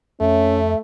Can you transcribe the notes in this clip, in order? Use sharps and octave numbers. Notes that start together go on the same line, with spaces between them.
F2 A3 C#4 E5